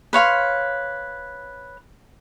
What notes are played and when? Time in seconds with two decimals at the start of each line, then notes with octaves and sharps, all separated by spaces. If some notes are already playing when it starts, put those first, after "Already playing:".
0.13 B4 C#5 F5 C6